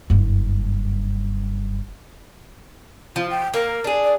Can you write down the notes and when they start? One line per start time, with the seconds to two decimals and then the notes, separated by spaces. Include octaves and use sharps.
0.10 F#1 G2
3.16 F3 F4
3.30 G5
3.54 A#3 A#4
3.84 D4 G#4
4.04 D5